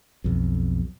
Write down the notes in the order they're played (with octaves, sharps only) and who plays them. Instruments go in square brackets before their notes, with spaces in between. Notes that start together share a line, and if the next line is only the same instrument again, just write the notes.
[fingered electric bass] B1 F2